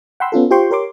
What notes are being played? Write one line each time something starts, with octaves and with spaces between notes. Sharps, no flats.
F#5 G5 B5 C6 E6
B3 C#4 F4 A4
F4 G4 C5 G5 C6 C#6
G4 A#4 C#5 C6 D6